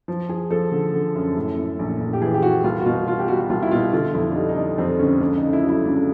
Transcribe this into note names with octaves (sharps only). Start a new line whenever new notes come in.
F3
F3 G#4
F3 A4
D3
D3
F#2
A2
A2
A#1
A#1
G4
E3 G#4
G4
E3 F#4
C2 F4
F#4
B2 F4
B2 F4
G4
G3 F#4
F#4
C2 F4
E4
B2 F4
D3 F4
F2 E4
D4
G3 D#4
D#4
D3 D4
F2 C4
D3 C#4
C#2 D4
D#4
C#3
E4
F#3 E4
C#2 D4